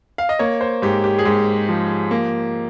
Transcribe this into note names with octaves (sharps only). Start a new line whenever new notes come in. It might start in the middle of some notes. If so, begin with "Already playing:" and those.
F5
D#5
A#3 C#5
C5
G#2 G4
G4
G#4
G#2 G4
F3
A#3